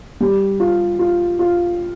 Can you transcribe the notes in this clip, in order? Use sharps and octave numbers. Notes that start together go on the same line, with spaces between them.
G3
F4
F4
F4